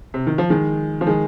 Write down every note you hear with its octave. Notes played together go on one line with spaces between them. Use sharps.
C3
D#3
F3
D#3 G#3
F3
D#3 G#3